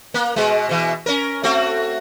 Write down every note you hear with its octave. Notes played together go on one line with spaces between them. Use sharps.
A#3
B2 G#3
B2 E3
C#4 A#4
A3 C4 F#4